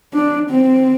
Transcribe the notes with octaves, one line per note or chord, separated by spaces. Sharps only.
D4
C4